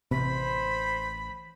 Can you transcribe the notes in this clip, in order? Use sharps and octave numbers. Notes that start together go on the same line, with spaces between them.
A1 C3 C5 B5